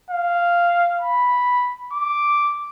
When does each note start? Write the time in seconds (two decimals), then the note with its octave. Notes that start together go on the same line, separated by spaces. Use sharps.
0.10 F5
1.01 B5
1.93 D6